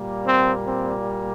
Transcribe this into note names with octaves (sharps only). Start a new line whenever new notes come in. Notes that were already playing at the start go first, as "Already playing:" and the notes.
Already playing: A#2 G3 A#3
C4
C4